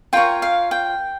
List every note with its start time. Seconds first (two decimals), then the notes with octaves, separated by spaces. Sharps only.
0.13 F4 A#4 C#5 G5
0.42 F5
0.71 G5